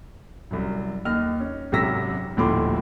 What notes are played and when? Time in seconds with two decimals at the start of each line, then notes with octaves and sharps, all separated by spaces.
0.51 C2 F#2
1.05 D#2 D#5 F6
1.40 C#4
1.72 G#1 F#2 C3 E6 A#6 B6
2.37 D#1 D2 A2 F3 C6 D6